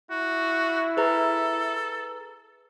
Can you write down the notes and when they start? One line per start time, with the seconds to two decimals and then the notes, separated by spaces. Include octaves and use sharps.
0.11 E4 F#4
0.97 G#4 A4 B4 A#5